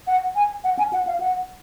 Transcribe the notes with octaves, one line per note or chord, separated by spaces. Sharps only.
F#5
G#5
F#5
G#5
F#5
F5
F#5